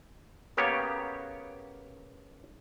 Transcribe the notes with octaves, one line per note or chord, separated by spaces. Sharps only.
C#3 A#3 B3 G4 C#5